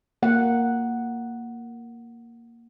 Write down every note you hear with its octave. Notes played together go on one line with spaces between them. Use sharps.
A#3 F#5